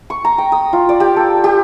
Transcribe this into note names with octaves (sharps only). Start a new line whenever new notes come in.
C#6
A#5
G5
D#6
F4
D5
G4
A4
G4